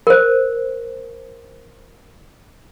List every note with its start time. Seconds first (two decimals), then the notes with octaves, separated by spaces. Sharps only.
0.07 A#4 C5